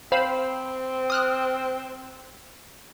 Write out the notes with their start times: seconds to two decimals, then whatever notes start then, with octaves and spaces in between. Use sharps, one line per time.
0.12 C4 C5 F5 B5
1.10 D#6 F6 F#6